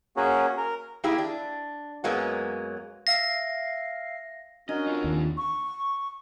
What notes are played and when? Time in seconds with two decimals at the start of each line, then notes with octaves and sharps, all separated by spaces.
0.16 A#3 C#4 F#4 G#4
0.57 A#4
1.04 A#3 E4 G4 G#4
1.18 D4
2.04 F#2 F#3 G#3 A#3 B3
3.07 E5 F5 A#6 C7
4.69 C#4 D4 F#4 A#4 D#5
4.87 F4 A4
5.04 D#2
5.38 C#6